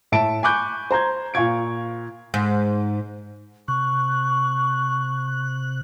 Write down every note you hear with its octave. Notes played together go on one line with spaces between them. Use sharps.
A2 E5 A5 D7
G#5 B5 C#6 D6 F#6 G6
C5 A#5 G6 G#6
A#2 F5 C#6 G#6 D7
G#2
C3 C#6 F#6